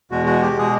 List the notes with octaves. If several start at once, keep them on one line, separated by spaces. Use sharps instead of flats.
E2 B2 G#3 F#4
F#4
G4
B2 G#3 G#4